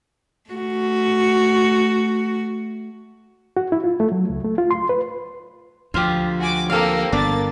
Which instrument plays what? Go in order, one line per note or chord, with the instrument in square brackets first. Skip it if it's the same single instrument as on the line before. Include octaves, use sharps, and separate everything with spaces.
[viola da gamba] A3 F#4
[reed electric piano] F#4
E4
F4
A3
F#3
C#2
A3
F4
C6
B4
[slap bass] D2 F3 [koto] F4 G4
[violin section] F#4 G#5 D6
[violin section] A#3 C4 G4 [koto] A4 F5
[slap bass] G1 B3 [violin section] A#3 A6 [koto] D4